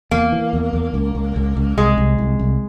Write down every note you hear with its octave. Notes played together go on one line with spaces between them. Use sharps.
E2 A#3
E3
E2
E2
C#2
C#2
C#2
C#2
C2 G#3
C2
C2
C2